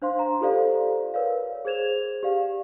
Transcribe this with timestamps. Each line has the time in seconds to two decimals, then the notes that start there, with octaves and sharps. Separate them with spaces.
0.02 D4 C5 F5 C6
0.19 A#5
0.41 F4 G4 A4 C5 D5 F5
1.14 A#4 B4 C#5 D5 F5
1.65 G#4 C5 G#6 E7 F7
2.23 G4 D5 F5